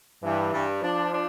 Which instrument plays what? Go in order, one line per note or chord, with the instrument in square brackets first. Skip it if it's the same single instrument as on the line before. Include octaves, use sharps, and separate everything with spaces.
[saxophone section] G2 [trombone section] E3
[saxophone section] G2
[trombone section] F3 [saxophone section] D4
[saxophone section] D4